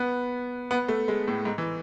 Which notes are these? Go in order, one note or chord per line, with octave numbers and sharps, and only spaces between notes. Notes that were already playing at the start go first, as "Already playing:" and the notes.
Already playing: B3
B3
A3
G#3
A2
G#2
E3